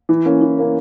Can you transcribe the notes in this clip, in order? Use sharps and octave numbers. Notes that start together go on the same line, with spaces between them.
E3
A#3 C#4
E3
A#3 C#4